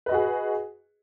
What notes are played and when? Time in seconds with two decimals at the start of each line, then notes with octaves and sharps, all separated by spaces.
0.06 B4
0.09 D#5
0.12 F#4
0.14 G#4